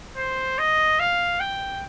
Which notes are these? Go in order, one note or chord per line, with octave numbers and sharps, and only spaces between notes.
C5
D#5
F5
G5